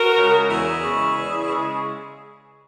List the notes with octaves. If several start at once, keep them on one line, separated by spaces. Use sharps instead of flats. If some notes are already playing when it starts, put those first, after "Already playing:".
Already playing: F#4 A#4
C#3
G#3
E2 E4 G#4
C#3 G#3
E2
C#3 G#3